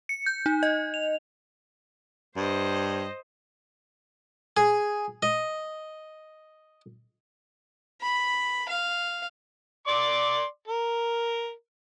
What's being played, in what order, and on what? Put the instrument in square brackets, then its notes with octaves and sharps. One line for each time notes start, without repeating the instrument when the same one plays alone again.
[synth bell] C#7
G6
D#4
D#5
F7
[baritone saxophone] G2 [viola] C5 D#5
[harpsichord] G#4
D#5
[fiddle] B5
F5
[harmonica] D5 C6 D6
A#4